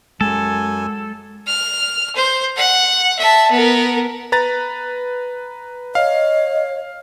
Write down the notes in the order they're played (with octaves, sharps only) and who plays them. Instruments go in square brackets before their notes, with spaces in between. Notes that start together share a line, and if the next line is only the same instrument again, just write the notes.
[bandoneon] F#2 G#5 [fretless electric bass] G#3 [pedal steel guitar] A4
[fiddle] F6
C5
F#5
E5 A5
B3 A#4
[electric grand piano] B4 A#5 A6
[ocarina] C#5 [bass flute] D#5 [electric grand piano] F5